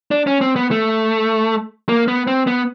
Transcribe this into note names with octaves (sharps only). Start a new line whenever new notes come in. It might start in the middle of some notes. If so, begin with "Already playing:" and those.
D4
C#4
C4
B3
A3
A#3
B3
C4
B3